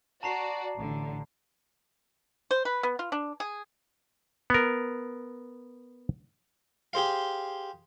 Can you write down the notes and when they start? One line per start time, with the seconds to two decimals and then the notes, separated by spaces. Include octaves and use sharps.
0.23 F#4 D5 A5 A#5 C7
0.78 A1 D3
2.51 C5
2.65 B4
2.83 B3
2.99 F4
3.12 D4
3.40 G#4
4.50 B3 A#4
6.93 G4 G#4 C5 F5